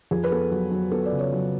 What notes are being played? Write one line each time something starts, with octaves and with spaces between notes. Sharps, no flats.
F2 G#4
B4
B3 A4
F#3
F#3
B3 A4
D5
C#3
C#5
F#3